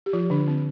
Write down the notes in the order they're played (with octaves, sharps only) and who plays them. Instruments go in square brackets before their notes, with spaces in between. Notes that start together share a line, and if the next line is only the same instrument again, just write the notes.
[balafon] G4
F3 F4
D3 D4
C4